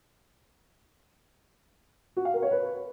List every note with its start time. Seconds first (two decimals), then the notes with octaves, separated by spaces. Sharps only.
2.17 F#4
2.25 F5
2.34 A#4
2.42 C#5
2.51 B4